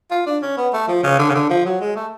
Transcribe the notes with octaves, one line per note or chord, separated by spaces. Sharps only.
F4
D4
C#4
B3
A3
F3
C#3
D3
C#3
D3
F3
F#3
G#3
A3